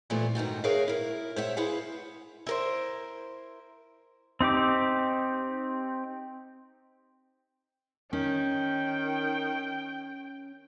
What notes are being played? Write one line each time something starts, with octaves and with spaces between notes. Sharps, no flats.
A#2 E3 F3 G3 A3 B3
G#2 D#3 D#4 F#4
G#4 A#4 B4 C#5 E5 F5
E4 A#4
C5 C#5 E5 F#5
E4 G#4 B4 C5 F5 F#5
E4 A#4 C5
C4 D#4 G4 D6
D#3 C#4 G5